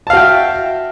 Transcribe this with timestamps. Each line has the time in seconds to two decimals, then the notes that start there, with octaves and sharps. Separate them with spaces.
0.07 A5
0.10 F5
0.13 F#4
0.17 G5
0.20 E5